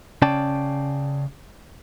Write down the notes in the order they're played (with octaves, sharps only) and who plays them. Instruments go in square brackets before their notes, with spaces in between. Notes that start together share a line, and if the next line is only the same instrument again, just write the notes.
[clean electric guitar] C#3 C#4 D5 G5 A5